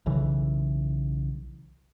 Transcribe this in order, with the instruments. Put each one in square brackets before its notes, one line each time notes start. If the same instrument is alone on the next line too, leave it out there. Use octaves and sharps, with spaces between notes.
[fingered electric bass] B1 C#3 E3